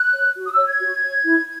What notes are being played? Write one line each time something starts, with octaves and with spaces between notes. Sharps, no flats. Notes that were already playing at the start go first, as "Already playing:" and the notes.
Already playing: F#6
C#5
F#4
D#6
E6
C#5
G#6
F#4
C#5
E4